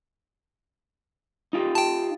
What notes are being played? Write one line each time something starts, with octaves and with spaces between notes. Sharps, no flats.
D#4 F4 G4
G5 A5